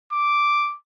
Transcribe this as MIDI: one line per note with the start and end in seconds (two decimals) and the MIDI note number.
0.13 0.76 86